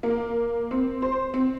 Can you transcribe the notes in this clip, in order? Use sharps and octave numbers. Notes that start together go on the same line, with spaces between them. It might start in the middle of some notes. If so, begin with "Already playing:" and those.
A#3
C4
C5
C4